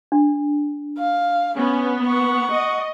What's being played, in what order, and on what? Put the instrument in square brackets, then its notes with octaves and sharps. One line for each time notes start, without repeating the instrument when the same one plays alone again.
[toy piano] D4
[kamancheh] F5
[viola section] B3 [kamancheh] C#4
[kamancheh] F#5 C#6
[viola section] D#5